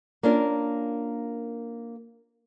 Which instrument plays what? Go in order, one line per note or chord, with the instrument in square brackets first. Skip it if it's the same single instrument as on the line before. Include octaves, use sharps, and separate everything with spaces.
[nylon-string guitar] A#3 C#4 D4 F4 A#4